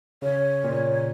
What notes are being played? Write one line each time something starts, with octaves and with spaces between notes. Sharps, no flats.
C#3 C#5
A#2